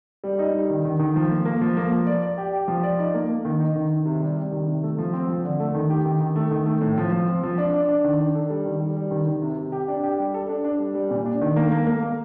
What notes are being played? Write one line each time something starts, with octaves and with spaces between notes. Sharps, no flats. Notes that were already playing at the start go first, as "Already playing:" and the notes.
G3
D#4
G3
D#3
D#3
D#3
F3
A#3
A#3
F3
A#3
F3
D5
D5
G4
G4
F3
D5
D#4
A#3
A#3
D#3
D#4
D#3
D#3
C3
G3
G3
D#3
C3
A3
F3
C4
F3
D3
A3
D#3
G4
D#3
D#3
A3
D#3
A3
A2
F3
F3
C4
F3
D4
D4
D4
D#3
D4
A4
G3
D#3
G3
G3
D#3
D#3
C3
C3
G4
D4
G4
G3
A4
D4
D4
G3
G3
A#2
D4
D#3
A#3
A#3
A#3
A#3